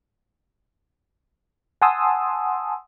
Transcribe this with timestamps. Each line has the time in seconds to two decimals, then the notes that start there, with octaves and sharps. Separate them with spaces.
1.82 F#5 G#5 A5 C6 D#6 E6